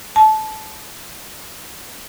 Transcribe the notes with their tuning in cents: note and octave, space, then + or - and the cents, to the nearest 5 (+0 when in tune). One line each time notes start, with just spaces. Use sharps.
A5 -20